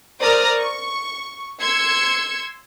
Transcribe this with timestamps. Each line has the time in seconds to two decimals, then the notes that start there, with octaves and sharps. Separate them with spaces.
0.22 A#4 C5 D5 A#5 D#6 F6
0.58 C#6
1.60 C6 E6 G#6 C#7